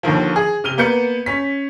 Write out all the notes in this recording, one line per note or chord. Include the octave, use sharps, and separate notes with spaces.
D#2 D3 D#3 F3
G#4
C3 F6 D#7 G7
A#3 B3 B4 G6 C#7
C#4 B6